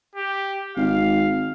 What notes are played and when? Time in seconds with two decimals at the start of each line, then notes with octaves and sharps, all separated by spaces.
0.16 G4
0.76 G#1 F5